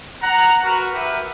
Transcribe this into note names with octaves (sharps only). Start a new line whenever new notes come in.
F#5 A#5
F#4 A#4 B4
F#4 G4 A#4 B4 E5 F#5